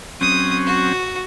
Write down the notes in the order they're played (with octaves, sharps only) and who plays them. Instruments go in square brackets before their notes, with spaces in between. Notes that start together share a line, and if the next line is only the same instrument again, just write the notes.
[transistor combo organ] F#3 C4 C#4 [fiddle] D#6
[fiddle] F#4